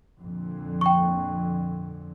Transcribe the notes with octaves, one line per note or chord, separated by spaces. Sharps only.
F2 A#2 D3
G5 C#6